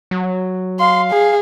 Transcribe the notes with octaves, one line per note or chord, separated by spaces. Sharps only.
F#3
F5 C6
G#4